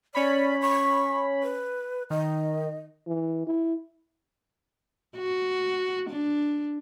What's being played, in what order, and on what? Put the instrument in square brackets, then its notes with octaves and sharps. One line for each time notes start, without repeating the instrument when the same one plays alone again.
[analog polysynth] C#4 C#5 B5 [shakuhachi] D5
[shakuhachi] C#6
B4
[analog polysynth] D#3 [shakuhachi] D#5
[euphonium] E3
E4
[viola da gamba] F#4
D4